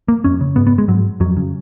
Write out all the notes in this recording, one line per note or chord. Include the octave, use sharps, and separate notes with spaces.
A#3
F2 C#4
C#3
G#2 B3
B3
G#3
G#2 F#3
F2 F#3
C#3